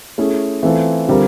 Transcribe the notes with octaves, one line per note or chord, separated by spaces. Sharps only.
A3 C#4 E4 G#4
E3 A3 C4 F4 A4
D3 G3 C4 F4 A#4